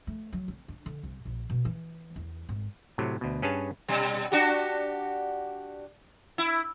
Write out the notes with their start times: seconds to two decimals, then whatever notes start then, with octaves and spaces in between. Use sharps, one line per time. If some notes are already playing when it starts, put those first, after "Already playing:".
0.07 A3
0.33 F#3
0.48 C4
0.68 D4
0.86 D3
1.03 C2
1.25 A#1
1.50 B2
1.65 E3
2.16 E2
2.49 G#1
2.98 A2 C3 F#3
3.21 D2 B2
3.42 G2 C#4 G#4 B4 C#5 A5
3.88 B2 G3
4.32 D4 F#4 G4
6.38 E4